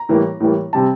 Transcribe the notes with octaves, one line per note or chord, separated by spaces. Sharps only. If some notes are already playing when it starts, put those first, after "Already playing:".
Already playing: A#5
A2 E3 G3 A#3
A2 E3 G3 A#3
C3 G3 C4 A5